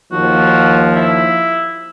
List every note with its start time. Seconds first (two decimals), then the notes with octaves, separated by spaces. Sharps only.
0.12 D#2 F3 F#4
0.96 E4